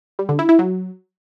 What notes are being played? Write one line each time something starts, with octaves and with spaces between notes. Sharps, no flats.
G3
D3
E4
E4
F#3